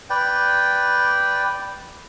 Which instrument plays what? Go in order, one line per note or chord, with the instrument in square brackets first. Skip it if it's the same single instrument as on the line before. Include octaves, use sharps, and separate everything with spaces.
[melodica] B4 D5 G5